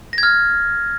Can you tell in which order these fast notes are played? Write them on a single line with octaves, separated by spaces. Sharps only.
A#6 G#6 F6